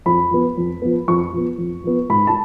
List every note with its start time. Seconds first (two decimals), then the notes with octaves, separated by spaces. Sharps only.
0.06 F2 B5
0.31 F3 B3
0.58 F2
0.82 F3 B3
1.08 F2 C#6
1.33 F3 B3
1.58 F2
1.84 F3 B3
2.09 G#2 B5
2.27 A5